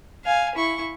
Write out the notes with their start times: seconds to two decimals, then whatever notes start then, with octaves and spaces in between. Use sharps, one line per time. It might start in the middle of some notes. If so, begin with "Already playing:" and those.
0.24 F5 G#5
0.55 E4 C#6